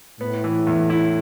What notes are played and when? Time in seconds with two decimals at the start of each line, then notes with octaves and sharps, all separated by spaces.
0.21 A2 B3
0.44 E3
0.67 E2
0.90 E4